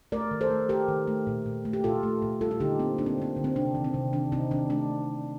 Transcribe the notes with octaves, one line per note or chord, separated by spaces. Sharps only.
A3 A#4 D5
D#3
A4 C5
A3
A3 G4 A#4
D#3
A3
A#2
A#2
A3
G4
A#2 F4 A4
A3
A#2
G3 F4 A4
F4
D3 D#4 G4
A#3 C4
A#3 D4
C4
D3 C4
D3
C4
C3 D4
D#3
C4
C3
D#3 D4
C3 C4 D#4
D#3 D4
A3 D4